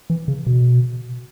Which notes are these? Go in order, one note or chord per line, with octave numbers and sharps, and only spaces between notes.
E3
C#3
B2